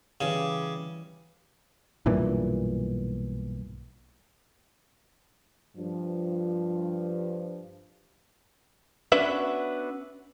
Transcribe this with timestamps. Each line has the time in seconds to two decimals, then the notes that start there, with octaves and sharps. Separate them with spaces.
0.21 C#3 E3 G3
2.06 B1 G2 A#2 E3
5.76 G2 F3
9.12 B3 C#4 D4 F#4 B4 E5